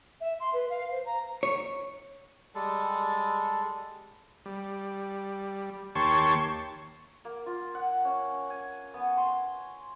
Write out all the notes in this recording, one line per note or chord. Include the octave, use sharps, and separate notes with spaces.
E5
C6
B4
F5
C5
A#5
C#5
G3 G#3 A4
G3
D#2 G4 C#5 A5 C6 C#6
A#3
F4
F#5
C#4
G#5
B3
C6